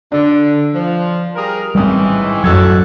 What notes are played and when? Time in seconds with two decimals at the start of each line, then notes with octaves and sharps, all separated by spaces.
0.12 D3 D4
0.73 F3
1.34 G3 G#4 A#4
1.75 A1 G#2 D#3 E3 G3 C4 D#6
2.44 A1 F#2 F#3 F#4 A4 E6 G#6